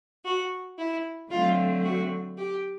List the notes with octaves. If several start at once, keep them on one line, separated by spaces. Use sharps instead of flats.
F#4
E4
D3 F#3 A3 C4 F4
F#4
G4